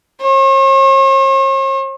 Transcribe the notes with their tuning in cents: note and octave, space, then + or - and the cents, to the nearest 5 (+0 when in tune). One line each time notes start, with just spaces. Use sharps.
C#5 -45